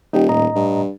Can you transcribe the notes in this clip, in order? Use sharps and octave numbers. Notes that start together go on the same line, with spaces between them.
D#1 D#4 G4
A2 D#5 A#5
G2